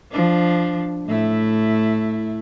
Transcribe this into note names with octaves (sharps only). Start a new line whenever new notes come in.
F3 D4
A2 A3 E4